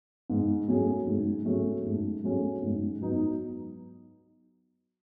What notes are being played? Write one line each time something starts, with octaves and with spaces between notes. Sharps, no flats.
G#2
F#3 A3 C#4 G#4
G#2
F#3 A3 C#4 G#4
G#2
F#3 A3 C#4 G#4
G#2
F#3 B3 D#4